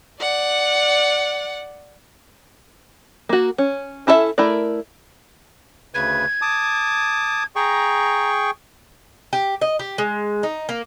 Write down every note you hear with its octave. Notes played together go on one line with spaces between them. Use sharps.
D5 F#5
A#3 F#4
C#4
C#4 E4 A4 A#4 E5
A3 E4 A#4 D5
D2 C#3 B4 G#6
A5 D6 D#6
G#4 G5 A#5 C#6
G4
D#5
G4
G#3
D#4
A#3